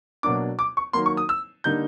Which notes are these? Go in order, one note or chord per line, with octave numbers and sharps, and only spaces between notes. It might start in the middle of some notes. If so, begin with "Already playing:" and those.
B2 F#3 A#3 D4 D6
D6
C#6
D#3 F#3 A#3 C6
C#6
D#6
E6
D3 G3 A#3 D#4 G6